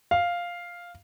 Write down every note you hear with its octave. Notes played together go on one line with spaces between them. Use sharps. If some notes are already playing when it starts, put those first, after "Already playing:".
F5